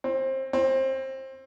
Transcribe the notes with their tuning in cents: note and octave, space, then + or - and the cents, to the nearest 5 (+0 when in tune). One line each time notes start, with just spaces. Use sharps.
C4 +25
C4 +25